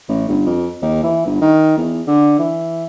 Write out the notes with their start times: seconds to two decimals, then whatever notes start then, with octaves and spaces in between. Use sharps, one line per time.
0.09 A1
0.28 G1
0.46 F2
0.82 D#2
1.03 E3
1.26 G1
1.41 D#3
1.78 E2
2.07 D3
2.39 E3